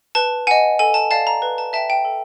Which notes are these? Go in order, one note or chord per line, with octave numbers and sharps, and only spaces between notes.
B4 A5
D#5 F#5 G#5
A4 G#5
A5
D5 F5 A5
A#5
B4
A5
E5 G5 A5
G5
A4